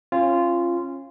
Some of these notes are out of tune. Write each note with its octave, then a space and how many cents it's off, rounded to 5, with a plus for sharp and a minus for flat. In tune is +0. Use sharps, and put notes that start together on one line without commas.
C#4 -35 F4 -15